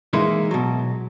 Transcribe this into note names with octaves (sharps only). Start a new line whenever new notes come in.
E3 G#3 A#3 D#4 E4
B2 F#3